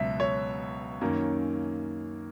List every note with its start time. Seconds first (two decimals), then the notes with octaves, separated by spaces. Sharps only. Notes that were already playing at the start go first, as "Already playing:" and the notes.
Already playing: C#2 B2 F#3 E5
0.20 C#5
1.01 F#2 D#3 A#3 C#4